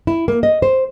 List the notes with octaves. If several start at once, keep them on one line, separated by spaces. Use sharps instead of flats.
E4
A#3
D#5
C5